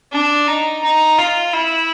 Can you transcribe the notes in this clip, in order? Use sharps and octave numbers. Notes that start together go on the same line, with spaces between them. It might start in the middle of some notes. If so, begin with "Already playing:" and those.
D4
D#4
D#4
F4
E4